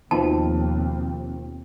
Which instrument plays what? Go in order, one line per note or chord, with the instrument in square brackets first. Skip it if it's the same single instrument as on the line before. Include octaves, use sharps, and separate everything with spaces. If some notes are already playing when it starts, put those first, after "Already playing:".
[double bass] D#2 [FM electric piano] B2 D#3 F3 [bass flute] C4 [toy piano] A5